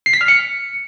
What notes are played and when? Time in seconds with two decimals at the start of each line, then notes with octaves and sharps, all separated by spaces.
0.06 C7
0.13 B6
0.21 F6
0.28 C#7